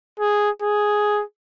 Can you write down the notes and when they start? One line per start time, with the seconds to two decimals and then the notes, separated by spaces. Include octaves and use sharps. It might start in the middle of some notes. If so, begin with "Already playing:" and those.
0.20 G#4
0.62 G#4